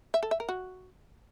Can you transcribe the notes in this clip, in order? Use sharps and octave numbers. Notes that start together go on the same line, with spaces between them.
E5
A4
E5
A#4
F#4